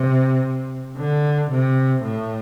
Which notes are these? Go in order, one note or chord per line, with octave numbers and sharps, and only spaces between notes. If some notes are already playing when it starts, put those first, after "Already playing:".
Already playing: C3
D3
C3
A2